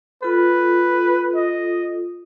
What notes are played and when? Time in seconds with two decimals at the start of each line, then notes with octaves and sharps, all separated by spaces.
0.23 F4 A4 B4
1.35 D#5